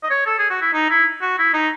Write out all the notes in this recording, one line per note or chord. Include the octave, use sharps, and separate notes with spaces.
D#5
C#5
A4
G#4
F#4
E4
D#4
E4
F#4
E4
D#4